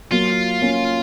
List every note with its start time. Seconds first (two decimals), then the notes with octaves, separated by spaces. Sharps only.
0.12 F#3 A#3 F4
0.61 A#3 C#4